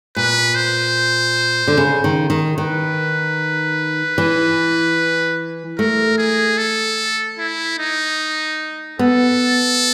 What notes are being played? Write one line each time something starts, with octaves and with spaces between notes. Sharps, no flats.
A#2 B4
C5
D3
C#3
D#3
D#3
D#3 B4
E3
A3 A#4
G#4
A4
E4
D#4
B3 A4